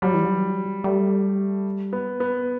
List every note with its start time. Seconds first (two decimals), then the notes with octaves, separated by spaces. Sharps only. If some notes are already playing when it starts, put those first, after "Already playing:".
0.02 F#3 G3
0.14 E3
0.25 F#3
0.84 G3 A3
1.93 B3
2.20 B3